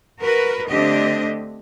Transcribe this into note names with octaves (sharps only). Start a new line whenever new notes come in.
F#4 A#4 B4
D3 A3 C4 D4 G4 D#5